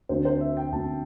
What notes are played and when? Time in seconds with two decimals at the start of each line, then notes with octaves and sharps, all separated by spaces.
0.09 D2 D3 A3 C4 C5
0.25 C5
0.41 E5
0.57 G5
0.73 D2 D3 A3 C4 A5